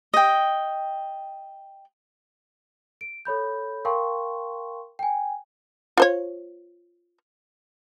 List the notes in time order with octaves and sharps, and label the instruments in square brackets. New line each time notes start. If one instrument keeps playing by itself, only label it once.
[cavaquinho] D#5 G5
[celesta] D7
A4 C#5 B5 G6
A#4 F5 G5 A5 C6 C#6
G5 G#5
[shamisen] F4 C5 C#5